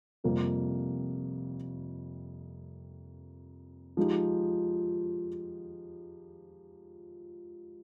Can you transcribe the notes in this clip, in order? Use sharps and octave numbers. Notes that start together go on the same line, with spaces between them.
F2 C3 G3 A#3 F4
F3 G#3 D#4 G4